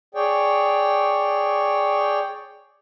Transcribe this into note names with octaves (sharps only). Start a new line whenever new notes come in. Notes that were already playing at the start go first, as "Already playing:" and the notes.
G#4 C#5 D5 G5